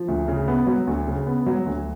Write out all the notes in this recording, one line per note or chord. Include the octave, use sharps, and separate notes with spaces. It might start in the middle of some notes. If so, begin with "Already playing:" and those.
Already playing: F3
D2
C#3
B3
F#3
D2
C#3
B3
F#3
D2